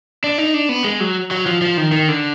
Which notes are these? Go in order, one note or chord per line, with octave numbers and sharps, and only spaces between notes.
D4
D#4
D4
B3
G#3
F#3
F#3
F3
F3
D#3
D#3
D3